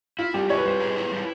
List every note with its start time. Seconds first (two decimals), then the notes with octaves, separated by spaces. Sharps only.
0.18 E4 F4
0.34 G3 G4
0.49 E4 C#5
0.58 B4
0.65 G3 C5
0.80 G#4
0.96 E4
1.12 G3